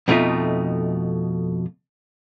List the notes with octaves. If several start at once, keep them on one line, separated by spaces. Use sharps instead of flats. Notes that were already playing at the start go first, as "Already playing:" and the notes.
F2 B2 A3 D#4 F4 E5